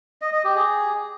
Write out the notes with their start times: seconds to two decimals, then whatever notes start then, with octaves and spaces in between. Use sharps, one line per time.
0.21 D#5
0.33 D#5
0.44 G4
0.55 G#4